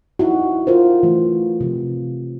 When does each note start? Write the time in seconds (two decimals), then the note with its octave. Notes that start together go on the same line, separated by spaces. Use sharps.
0.19 D#4 E4 F#4
0.67 F4 A#4 C5
1.03 E3 A3
1.61 C3 F3